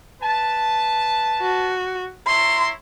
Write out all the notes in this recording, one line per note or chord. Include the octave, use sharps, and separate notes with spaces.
B4 A5
F#4
E4 C#5 A#5 C6